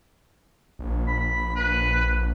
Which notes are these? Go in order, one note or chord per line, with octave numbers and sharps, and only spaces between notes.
A#1
B5
B4